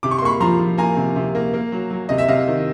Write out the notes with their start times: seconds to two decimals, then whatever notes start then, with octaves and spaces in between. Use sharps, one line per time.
0.03 C3 D6
0.11 C#6
0.19 C6
0.22 A#3 B5 C#6
0.40 F3 A#5 C6
0.59 F3
0.78 A#3 G#5 A#5
0.97 C3
1.16 C3
1.35 A#3
1.54 A#3
1.72 F#3
1.91 F#3
2.09 C3 D#5
2.18 E5
2.28 C3 D#5 F5
2.48 D#3